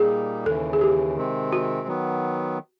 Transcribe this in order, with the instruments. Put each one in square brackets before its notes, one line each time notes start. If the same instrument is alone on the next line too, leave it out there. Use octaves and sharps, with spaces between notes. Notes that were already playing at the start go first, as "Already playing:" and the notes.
Already playing: [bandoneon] A#2 G3 A#3 D#4 [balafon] G#4
[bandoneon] D#2 C#3 E3 [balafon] A4
[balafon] G#4
G4
[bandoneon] C3 D#3 G#3 C4
[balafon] F#4
[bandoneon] D#3 F#3 B3